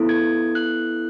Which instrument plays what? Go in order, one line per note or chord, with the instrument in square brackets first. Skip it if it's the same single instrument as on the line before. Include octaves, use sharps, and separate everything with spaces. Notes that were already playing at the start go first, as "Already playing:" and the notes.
Already playing: [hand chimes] B3 E4 A4
G#6
F#6